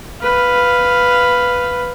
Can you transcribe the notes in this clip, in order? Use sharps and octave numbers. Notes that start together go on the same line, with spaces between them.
B4 F5